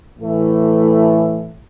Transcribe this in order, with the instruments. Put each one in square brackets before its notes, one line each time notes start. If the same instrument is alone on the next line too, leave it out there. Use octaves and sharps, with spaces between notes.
[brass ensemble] A2 E3 A3